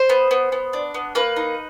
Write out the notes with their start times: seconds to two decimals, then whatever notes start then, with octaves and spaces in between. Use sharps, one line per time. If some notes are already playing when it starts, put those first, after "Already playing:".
Already playing: C5
0.10 B3
0.31 B3
0.52 B3
0.73 D4
0.94 B3
1.15 A#3 B4
1.36 D#4